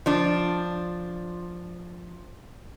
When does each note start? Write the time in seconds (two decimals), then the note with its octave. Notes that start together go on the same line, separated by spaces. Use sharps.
0.06 F3 D4